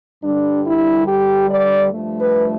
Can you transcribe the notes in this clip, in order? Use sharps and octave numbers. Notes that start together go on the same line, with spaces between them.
G2 D3 G3 D4
E4
G4
D5
G2 F3 A3
B4